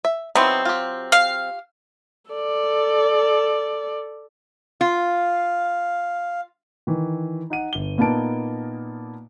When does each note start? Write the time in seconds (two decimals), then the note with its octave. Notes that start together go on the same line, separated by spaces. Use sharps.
0.05 E5
0.35 F#3 B3 C4 D#4 E4
0.65 F4 G4
1.12 F5
2.31 A4 D5
4.81 F4 F5
6.87 D#3 E3
7.50 D#4 F#5 D#7
7.73 G1 G7
7.98 A#2 A#3 B3 D#4 A5 D7